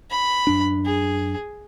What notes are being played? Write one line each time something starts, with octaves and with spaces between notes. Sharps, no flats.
B5
F#2 D4
G#4